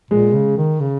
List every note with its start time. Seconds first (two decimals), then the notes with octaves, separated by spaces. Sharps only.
0.11 A#2 G#3
0.34 C#3
0.57 D#3
0.80 C#3